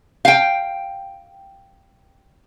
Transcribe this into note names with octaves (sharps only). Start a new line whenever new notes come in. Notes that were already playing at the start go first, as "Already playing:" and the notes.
F5 G5